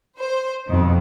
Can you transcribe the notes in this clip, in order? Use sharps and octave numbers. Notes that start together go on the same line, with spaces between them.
C5
F2 B2 D#3